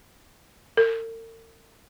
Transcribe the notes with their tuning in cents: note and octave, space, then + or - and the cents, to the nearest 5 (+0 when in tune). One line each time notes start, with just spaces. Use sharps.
A#4 -45